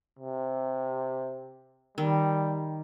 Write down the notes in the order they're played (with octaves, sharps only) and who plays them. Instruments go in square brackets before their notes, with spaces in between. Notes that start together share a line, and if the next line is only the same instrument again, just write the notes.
[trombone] C3
[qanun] D#3 [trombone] G3